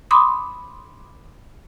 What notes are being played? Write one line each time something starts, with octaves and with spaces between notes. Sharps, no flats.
B5 C6 D6 D#6